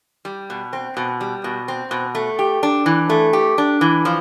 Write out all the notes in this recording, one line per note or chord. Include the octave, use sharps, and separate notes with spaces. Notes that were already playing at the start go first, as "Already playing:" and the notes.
G3
B2
C4
B2
G3
B2
C4
B2
A3
G4
D4
E3
A3
G4
D4
E3
F3